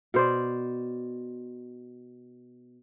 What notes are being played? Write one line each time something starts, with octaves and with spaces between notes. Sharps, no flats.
B2 C5 D5